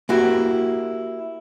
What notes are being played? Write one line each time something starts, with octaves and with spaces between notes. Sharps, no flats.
A#3 E4 F#4 G4